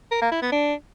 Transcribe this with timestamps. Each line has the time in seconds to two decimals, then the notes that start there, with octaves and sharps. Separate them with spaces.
0.11 A#4
0.21 A#3
0.32 E4
0.42 B3
0.52 D4